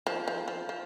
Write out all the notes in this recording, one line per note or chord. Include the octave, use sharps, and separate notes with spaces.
F3
F3
F3
F3